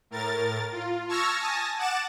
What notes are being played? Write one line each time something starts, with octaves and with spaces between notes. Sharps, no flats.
A2 A#4 A6
F4
A5 C#6 E6 F6 G#6 A#6
G#5 A5 D#6 A#6
F#5 D6 A6 E7